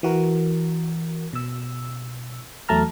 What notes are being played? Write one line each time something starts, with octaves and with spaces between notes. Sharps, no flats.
E3 F#4 A#4
B2 E6
E2 F#3 A3 A5 A#5 F6